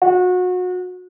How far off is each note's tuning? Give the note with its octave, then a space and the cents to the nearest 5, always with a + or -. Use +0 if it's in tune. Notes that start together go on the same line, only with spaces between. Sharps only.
F#4 -30